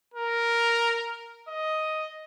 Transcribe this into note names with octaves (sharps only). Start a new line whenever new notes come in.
A#4
D#5